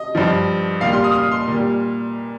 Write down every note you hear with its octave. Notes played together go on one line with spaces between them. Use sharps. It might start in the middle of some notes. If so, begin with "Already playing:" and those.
Already playing: D#5
G2 F3
A#2 G3 F5
C6
D#6
F6
D#6
C6
A#2 G3